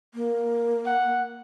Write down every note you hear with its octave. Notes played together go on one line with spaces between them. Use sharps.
A#3
F#5